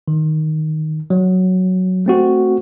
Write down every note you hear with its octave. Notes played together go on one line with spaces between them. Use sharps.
D#3
F#3
A3 C4 F#4